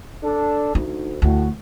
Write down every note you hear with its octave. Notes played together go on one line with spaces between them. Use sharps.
D4 A4
D2 D#4
D2 A2 F#4